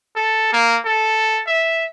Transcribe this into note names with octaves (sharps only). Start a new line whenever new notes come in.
A4
A#3
A4
E5